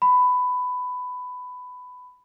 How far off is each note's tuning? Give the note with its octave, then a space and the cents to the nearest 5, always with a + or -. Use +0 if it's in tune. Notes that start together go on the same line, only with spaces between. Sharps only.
B5 +15